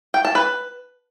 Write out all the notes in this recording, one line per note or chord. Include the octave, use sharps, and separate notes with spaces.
G5
A5
B4